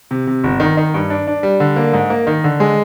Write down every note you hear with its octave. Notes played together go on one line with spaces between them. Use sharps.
C3
C3
G1
D#3
D#3
G2
D4
D4
G3
D3
A#3
G#2
A#3
D#3
D3
G#3